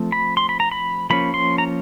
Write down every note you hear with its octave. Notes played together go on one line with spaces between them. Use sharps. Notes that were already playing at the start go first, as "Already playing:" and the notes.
Already playing: F3 A3 C4
B5
C6
B5
A#5
B5
F3 A#3 C#4 B5
C6
A#5